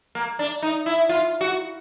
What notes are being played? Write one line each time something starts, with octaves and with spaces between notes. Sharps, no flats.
A#3
D4
D#4
E4
F4
F#4